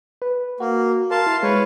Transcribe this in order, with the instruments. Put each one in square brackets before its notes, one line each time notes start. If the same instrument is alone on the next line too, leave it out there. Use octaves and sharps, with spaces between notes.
[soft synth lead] B4
[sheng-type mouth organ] A#3 [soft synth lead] F#4
[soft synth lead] A#4 [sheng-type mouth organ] F5 A5 C6
[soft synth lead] E4
[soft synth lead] G#3 [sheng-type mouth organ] B4 C#5